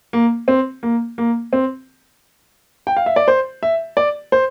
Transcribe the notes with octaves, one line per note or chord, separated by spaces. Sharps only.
A#3
C4
A#3
A#3
C4
G5
F5
E5
D5
C5
E5
D5
C5